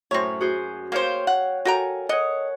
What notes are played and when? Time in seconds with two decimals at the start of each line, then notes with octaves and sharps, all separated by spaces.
0.11 F#2 A2 C4 C#5
0.40 F#4 G#4 C5
0.92 A#3 C5 C#5 F5 G5
1.27 F#5
1.65 F#4 A4 A#4 G5 G#5 A#5
2.09 C#5 D#5 F#5